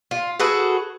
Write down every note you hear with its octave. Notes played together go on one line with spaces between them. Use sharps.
F4
F#4 G#4 A4 B4